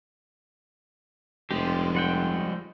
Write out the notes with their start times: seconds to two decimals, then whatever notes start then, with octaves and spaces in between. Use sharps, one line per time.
1.51 F1 F3 G#3 G4
1.95 G3 F#5 G5